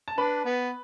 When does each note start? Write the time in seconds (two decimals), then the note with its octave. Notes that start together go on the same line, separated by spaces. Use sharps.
0.08 A5
0.18 D4 B4 B5
0.45 B3